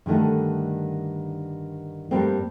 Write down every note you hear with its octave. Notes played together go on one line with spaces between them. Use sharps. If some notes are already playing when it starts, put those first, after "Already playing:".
G2 D3 D#3 A3 D#4
G2 G3 A3 A#3 C4